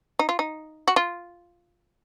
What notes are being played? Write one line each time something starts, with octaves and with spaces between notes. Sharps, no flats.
D#4
F4
D#4
F#4
F4